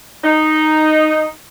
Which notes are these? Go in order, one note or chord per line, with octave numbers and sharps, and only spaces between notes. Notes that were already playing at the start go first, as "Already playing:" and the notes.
D#4